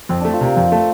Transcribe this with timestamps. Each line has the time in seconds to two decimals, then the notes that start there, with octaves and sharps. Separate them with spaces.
0.09 F2 C4
0.20 A3 D4
0.33 F4
0.41 C3 A#4
0.56 F2 C5
0.72 A3